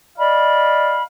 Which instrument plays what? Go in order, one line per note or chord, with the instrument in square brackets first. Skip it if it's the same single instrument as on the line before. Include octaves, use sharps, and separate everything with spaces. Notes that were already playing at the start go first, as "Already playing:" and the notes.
[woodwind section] D5 D#5 F5 B5